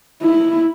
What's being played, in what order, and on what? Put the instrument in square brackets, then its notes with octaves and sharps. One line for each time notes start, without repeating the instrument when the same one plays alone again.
[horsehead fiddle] E4